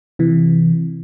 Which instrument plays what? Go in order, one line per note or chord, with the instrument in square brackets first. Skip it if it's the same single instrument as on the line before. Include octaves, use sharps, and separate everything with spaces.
[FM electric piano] C3 E3